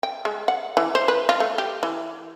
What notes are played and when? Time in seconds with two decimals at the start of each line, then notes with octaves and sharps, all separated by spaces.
0.03 G5
0.25 G#3
0.48 F#5
0.77 E3
0.95 C5
1.08 B4
1.29 F4
1.40 A3
1.58 G4
1.83 E3